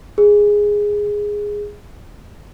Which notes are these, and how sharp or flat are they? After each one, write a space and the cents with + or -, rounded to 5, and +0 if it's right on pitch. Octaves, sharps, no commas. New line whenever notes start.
G#4 -5